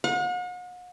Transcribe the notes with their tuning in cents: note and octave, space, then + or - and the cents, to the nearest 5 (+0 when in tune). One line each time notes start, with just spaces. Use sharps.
F#5 -45